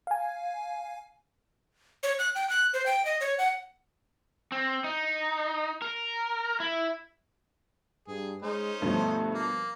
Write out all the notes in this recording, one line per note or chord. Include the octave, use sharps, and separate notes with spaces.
F5 G#5
C#5
F#6
G5
F#6
C5
G5
D#5
C#5
F#5
C4
D#4
A#4
E4
G2 G#4
G#3 C#4 D#4 C5
G2 B2 F3 A3
A#3